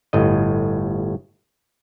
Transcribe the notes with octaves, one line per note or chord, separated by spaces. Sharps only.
G1 A2 D#5